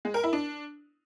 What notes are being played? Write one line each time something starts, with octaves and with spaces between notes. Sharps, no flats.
G#3
A#4
E4
D4